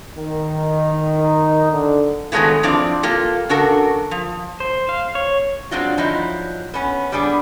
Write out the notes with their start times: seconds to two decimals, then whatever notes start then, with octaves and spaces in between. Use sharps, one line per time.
0.17 D#3
1.16 D#4
1.71 D3
2.32 D#3 F#3 G#3 A3 B3 E4
2.63 F3 C4 D4 E4 D5
3.03 A#3 F4 G4 A4
3.49 C#3 D4 F#4 A4 A#4
4.11 F3
4.60 C5
4.89 F5
5.15 C#5
5.71 F#3 G#3 C4 D4 F4 F#4
5.98 F3 F#3 D#4 E4
6.74 B3 C#4
7.12 G3 B3 D4 G#4